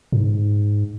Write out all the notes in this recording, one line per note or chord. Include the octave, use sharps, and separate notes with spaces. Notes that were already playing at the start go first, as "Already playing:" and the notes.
G#2